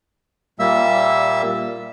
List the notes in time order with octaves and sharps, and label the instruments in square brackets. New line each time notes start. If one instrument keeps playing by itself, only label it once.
[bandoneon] A#2 G3 A#3 E5 E6